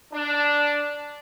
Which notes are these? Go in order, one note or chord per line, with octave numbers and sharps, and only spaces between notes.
D4